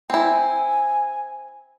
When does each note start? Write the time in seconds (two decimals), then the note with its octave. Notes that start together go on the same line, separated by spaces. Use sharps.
0.10 C4 E4 G#5